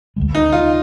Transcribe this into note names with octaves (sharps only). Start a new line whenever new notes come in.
D2 D3 F3 G#3
D#4
F4